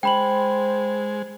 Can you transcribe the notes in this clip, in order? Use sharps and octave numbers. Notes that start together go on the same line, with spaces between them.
G#3 C5 G5 B5 F#7